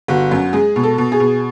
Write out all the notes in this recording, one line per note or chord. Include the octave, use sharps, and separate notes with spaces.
G1 F#4
F#2
G#3 G#4
B2
A4
B2
G#4
B2